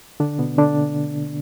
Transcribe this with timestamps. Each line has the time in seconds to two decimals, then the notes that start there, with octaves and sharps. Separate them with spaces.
0.20 D3 D4
0.39 B2 B3
0.58 D3 D4